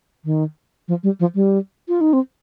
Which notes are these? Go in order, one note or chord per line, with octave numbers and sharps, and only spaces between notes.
D#3
F3
G3
F3
G3
F4
D#4
C4